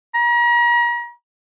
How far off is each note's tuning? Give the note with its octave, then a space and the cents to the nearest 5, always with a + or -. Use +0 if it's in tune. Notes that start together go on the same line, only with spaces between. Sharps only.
A#5 +40